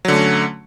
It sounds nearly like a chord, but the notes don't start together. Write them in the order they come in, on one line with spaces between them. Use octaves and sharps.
F#3 D3 A3 C#4